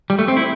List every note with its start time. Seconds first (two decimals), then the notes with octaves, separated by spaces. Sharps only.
0.10 G3
0.19 A3
0.28 C4
0.37 E4